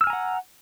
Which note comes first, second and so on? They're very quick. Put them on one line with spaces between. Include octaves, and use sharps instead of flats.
E6 F6 G#5 A#5 F#5